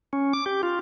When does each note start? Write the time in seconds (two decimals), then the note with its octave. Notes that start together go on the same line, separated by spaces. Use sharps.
0.13 C#4
0.33 D6
0.46 G4
0.63 F4